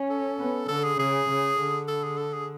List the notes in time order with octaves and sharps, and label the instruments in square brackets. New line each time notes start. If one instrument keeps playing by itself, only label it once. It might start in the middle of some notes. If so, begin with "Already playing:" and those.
Already playing: [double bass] C#4
[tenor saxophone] A4
[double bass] B3
[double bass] D3 [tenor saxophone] A4
[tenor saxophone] G#4
[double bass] C#3 [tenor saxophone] G#4
[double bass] C#3
D3
[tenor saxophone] A4
G#4
A4
G#4